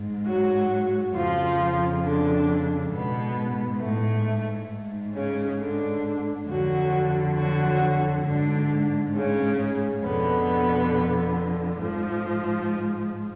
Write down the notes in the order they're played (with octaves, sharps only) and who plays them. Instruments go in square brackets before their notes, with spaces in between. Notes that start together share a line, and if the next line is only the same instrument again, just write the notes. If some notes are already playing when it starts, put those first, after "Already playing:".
Already playing: [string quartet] G#2
F#3 F#4
F2 C#3 F3 F4
D3 D4
G#2 B2 B3
A2 A3
G#2
C#3 C#4
D3 D4
F2 D3 F#3 F#4
F#3 F#4
G#2 D3 D4
C#3 C#4
F2 B2 D3 B3
G#2 F3